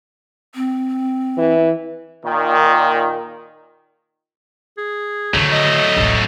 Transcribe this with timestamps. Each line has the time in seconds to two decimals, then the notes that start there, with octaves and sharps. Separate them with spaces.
0.55 C4
1.38 E3
2.23 A#2 D#3
4.78 G#4
5.34 D3 D#3 F#3 A3
5.52 D#5
5.96 D1 A1